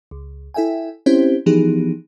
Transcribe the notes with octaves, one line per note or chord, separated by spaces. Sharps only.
C#2
E4 A4 E5 G5 G#5
C4 C#4 E4 G4 C5
E3 F3 B3 D#4 G4 G#4